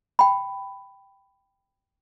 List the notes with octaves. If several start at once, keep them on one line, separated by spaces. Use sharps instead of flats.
G5 B5